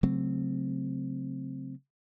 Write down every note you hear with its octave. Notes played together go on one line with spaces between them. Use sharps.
C#3 F#3 A3 C4